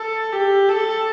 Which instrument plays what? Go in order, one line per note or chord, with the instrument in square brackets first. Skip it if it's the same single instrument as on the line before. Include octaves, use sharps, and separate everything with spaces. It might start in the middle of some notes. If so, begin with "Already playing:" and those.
Already playing: [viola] A4
G4
A4